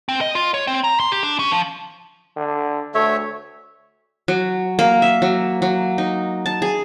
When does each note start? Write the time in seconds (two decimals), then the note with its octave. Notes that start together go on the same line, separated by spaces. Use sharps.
0.09 C4
0.21 D#5
0.35 F4
0.54 C#5
0.67 C4
0.84 A#5
1.00 C6
1.12 G4
1.23 D4
1.39 C#4
1.51 F3
2.37 D3
2.95 D2 A3 C#5 E5
4.28 F#3
4.79 A#3
5.02 E5
5.22 F#3
5.62 F#3
5.98 D#4
6.46 A5
6.62 G#4